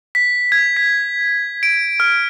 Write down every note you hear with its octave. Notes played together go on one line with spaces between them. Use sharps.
B6
G#6
B6
D7
F6